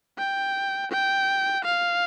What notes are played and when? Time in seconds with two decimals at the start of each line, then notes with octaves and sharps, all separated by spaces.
0.19 G5
0.92 G5
1.65 F5